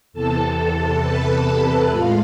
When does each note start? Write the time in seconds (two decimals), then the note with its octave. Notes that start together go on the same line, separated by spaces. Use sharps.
0.13 E2 C3 E3 A4 A5
1.01 B4 B5
1.45 A4 A5
1.89 A2 G#3 F4 F5